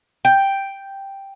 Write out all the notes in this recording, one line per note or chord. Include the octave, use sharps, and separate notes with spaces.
G5